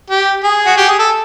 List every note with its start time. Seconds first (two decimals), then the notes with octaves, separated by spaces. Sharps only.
0.10 G4
0.44 G#4
0.66 F#4
0.77 G4
0.88 G#4
0.99 A4